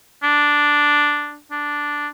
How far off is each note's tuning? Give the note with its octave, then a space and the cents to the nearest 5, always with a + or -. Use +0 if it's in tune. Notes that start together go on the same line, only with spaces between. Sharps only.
D4 +0
D4 -5